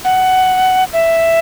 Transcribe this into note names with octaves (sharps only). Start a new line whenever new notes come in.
F#5
E5